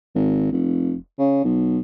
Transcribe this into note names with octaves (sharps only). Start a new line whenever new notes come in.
G#1
F1
C#3
B1